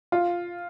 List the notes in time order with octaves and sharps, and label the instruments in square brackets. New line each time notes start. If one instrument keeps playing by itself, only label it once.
[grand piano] F4